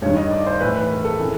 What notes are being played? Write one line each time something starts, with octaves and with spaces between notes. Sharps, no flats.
G2 D#3 C#5
D#5
D5
C5
A2 E3 B4
B4
A#4
A4
C#3 E3